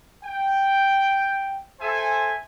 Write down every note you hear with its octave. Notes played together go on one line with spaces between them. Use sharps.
G5
A4 C5 E5 G#5